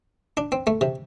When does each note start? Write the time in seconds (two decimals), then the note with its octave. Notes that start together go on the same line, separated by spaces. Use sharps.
0.37 D4
0.52 C4
0.67 A3
0.81 C3